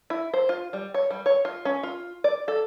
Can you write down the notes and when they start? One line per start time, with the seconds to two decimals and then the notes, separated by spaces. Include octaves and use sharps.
0.10 E4
0.34 C5
0.49 F4
0.73 G3
0.94 C#5
1.11 G3
1.26 C#5
1.45 F4
1.65 C#4
1.83 F4
2.24 D5
2.48 A4